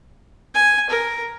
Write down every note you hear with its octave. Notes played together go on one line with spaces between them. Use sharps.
G#5
A#4